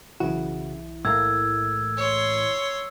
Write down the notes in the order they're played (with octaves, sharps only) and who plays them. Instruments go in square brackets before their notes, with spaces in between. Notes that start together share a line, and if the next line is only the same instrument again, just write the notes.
[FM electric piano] B1 E3 E4 [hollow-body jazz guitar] C#3 F#4
[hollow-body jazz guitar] A2 A3 A#3 [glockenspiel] E6 G#6
[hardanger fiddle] C#5 C6